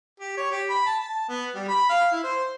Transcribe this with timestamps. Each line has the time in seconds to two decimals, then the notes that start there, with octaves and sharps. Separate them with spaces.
0.20 G4
0.37 C#5
0.51 G4
0.70 B5
0.86 A5
1.00 A5
1.29 B3
1.55 G3
1.68 B5
1.90 F5
2.12 E4
2.24 C5